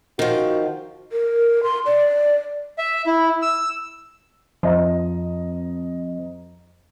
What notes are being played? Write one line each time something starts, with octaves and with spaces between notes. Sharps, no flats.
D#3 F3 F#4
A#4
C6
D5
E5
E4
E6
F2 F3 D#5 A#5